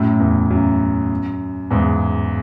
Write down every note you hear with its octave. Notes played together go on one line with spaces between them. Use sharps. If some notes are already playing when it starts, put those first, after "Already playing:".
Already playing: F#2 A2
E2
F#2
E2 G#2